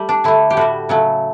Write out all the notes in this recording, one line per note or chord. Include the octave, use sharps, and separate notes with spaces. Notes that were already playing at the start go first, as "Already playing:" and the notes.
Already playing: G3 A3
D4
D3 A3 E4
G4
A2 G3 F#4
C#3 F#3 A3